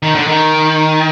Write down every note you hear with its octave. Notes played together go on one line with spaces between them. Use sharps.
D#3
D3
D#3